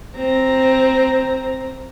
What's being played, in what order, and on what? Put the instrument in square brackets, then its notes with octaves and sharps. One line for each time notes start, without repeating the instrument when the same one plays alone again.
[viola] C4 A#5